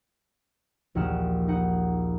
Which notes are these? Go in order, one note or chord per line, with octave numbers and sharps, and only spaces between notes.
A#1 D#2 F#5 F6 E7
D#4 F#5